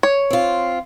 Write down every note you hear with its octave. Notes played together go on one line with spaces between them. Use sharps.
C#5
C4 F4